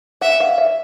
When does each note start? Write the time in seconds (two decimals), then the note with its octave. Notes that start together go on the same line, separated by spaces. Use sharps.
0.21 E5 F#5
0.40 F5
0.58 E5